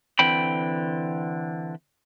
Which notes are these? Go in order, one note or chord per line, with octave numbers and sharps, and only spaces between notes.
D3 E3 C4 G5 B5